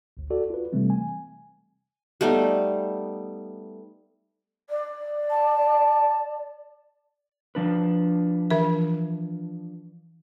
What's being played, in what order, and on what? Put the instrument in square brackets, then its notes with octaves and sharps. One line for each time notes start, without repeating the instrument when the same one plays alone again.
[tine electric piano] G#1 D2
F#4 A4 D5
F4 B4
C3 E3 G3 A3 C4
G#5
[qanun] G3 A3 B3 D#4
[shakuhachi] D5
[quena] A5
[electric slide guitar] F3 D4 B4
[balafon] E3 E5